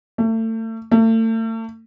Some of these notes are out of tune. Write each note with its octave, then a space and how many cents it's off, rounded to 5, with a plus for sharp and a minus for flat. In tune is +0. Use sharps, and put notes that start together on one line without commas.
A3 +30
A3 +35